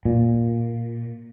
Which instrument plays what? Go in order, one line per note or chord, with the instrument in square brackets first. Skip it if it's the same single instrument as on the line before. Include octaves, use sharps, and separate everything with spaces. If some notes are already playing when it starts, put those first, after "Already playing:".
[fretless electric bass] A#2